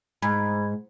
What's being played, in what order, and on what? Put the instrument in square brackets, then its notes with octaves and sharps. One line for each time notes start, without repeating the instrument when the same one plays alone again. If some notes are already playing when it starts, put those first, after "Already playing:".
[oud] G#2 [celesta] B5 G#6